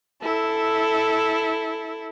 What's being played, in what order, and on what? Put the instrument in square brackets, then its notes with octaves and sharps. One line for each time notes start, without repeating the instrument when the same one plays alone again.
[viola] E4 [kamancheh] A4